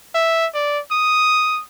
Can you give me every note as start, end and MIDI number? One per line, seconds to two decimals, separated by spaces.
0.14 0.47 76
0.54 0.80 74
0.91 1.61 87